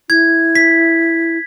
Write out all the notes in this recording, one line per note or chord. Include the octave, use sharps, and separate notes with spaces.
E4 G#6
B6